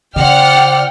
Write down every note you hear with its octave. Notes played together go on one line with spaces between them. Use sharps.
C#3 F4 C5 D5 F#5 G5 F6